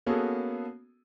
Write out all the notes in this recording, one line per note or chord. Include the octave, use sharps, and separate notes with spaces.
A#3 B3 C#4 F#4 G#4 A4